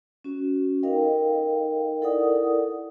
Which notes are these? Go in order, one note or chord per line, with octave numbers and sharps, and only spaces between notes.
C#4 F#4
D#4 A4 A#4 D#5 F5 G5
E4 A4 A#4 D5 F#5 D#6